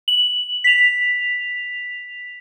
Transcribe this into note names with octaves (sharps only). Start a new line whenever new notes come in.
F#7
B6 F7